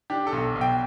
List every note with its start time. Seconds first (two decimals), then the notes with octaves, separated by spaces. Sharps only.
0.10 D4 G4
0.27 A4
0.32 B1
0.56 B1
0.61 G5